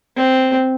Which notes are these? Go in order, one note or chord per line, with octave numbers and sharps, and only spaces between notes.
C4